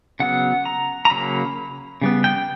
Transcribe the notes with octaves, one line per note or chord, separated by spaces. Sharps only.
C#3 F#3 B3 F#5
A#5
A#5
C#3 F#3 A#3 C#4 B5
C#3 G3 B3
G5